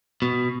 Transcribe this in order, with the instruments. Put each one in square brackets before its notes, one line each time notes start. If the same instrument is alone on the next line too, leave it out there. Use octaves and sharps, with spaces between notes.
[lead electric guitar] B2